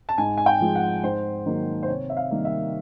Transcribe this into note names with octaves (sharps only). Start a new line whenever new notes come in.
A5
G#2 G#5
G#5
G5
F3 G#3
F#5
G#2 C5
D#3 F#3 A#3
C5
C3 C#5
E5
F5
D#3 G3 A#3
E5